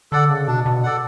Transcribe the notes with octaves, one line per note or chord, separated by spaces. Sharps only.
D3 A4 D5 F#5
C#3
B2 D4
B2
A4 D5 F#5